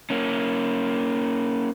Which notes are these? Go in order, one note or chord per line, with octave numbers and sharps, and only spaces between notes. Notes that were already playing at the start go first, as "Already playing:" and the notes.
A#3 C#4